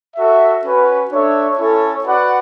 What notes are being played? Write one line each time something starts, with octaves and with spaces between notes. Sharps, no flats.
F#4 A4 E5
C#4 F#4 B4
D4 A4 C#5 E5
C#4 E4 A4 C#5
F#4 B4 D5 F#5